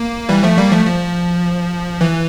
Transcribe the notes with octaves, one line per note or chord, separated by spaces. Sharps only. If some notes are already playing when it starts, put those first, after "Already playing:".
Already playing: A#3
E3 G3
F3 A3
G3 A#3
F3 A3
F3
E3